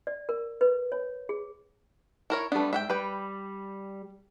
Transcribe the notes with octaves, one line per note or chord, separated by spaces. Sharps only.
D5
A#4
B4
C#5
G#4
E4 A#4 C#5
G3 A3 B3 D4
G#2 E5 F#5 G5
G3 B4 G5